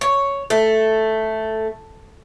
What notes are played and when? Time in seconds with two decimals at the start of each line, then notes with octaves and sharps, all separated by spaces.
0.01 C#5
0.50 A3